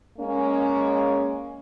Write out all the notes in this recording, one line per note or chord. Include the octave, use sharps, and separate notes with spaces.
G#3 A#3 C#4